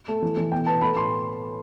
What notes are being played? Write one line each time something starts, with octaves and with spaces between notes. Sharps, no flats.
A3
E3
E3
B2 G5
B3 A5
A3 B5
A2 C6